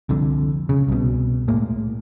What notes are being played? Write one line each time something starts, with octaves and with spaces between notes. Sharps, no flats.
C2 F2 D3
C#3
C2 B2
A2 G#3 A#3